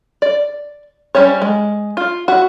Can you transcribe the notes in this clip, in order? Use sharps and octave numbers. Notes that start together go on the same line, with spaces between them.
D5
G3 C#4 C5 C#5
G#3
F4
E4 F#4